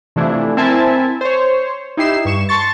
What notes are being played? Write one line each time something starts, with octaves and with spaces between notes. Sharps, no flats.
C3 E3 F3 A3 D4 E4
C4 E4 A#4 E5 G#5 A5
C5 C#5
D#4 E4 G4 C7 E7
G2 C#6 E7
A5 C6 C#6 A6